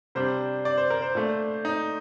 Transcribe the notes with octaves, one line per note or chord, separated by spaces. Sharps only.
C3 G3 D4 C5
D5
C5
A#4
C5
A#2 A3 D4
D#4